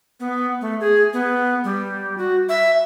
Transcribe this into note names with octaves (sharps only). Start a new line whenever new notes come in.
B3
A3
G#4
B3
G3
F#4
E5